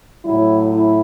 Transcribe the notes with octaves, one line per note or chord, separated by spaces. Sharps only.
A2 F#3 E4
E4